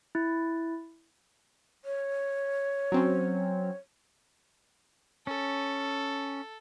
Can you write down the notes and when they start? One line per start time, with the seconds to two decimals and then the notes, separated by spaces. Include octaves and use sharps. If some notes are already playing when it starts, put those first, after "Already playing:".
0.15 E4
1.85 C#5
2.92 F#3 C4 C#4
5.27 C#4 A4